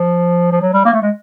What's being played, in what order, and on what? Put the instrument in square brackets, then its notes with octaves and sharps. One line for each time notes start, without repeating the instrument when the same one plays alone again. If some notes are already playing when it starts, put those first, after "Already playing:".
Already playing: [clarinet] F3
F3
F#3
G3
A#3
A3
G#3